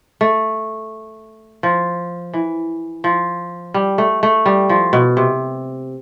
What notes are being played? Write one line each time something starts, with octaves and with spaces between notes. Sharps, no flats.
A3
F3
E3
F3
G3
A3
A3
G3
F3
B2
C3